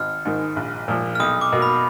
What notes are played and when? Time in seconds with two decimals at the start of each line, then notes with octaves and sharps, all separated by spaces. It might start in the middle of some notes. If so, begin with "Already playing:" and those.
Already playing: G#1 F6
0.25 G#2 D#3
0.56 A#1
0.88 A#2 F3
1.15 F6
1.20 B1 D#6
1.41 D6
1.52 B2 A#3
1.62 B5